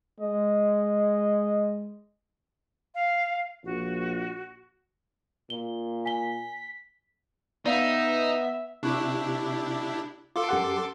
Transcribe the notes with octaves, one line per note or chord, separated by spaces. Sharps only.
G#3 D#5
F5
A#1 F#4
A#2 G7
G#5 B6 G7
B3 D#4 D5 E5 F5
C3 D4 E4 G4 C#6 F#6
F4 A4 C6 D6
F#2 G4 F#5